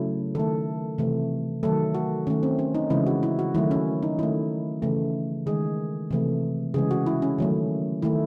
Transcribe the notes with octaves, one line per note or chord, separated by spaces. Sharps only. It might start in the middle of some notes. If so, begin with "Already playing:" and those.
Already playing: C#3 F#3 A3 E4
D#3 A3 A4
C3 E3 A3
D#3 F#3 A3 A4
F#4
D#3 A3 C#4
C4
C#4
D#4
C#3 E3 G#3 E4
F#4
E4
F#4
D#3 F#3 A3 E4
C#4
D#4
D#3 A3 E4
C#3 E3 A3
D#3 G#3 G#4
C3 E3 A3
C#3 E3 G#3 G#4
F#4
E4
C#4
D#3 F#3 A3
D#3 A3 E4